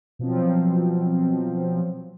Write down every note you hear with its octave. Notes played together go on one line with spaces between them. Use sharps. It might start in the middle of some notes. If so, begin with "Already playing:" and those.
B2 F3 F#3 C4